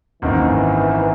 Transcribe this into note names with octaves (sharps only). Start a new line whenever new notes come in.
G#1 F#2 D#3 E3 A#3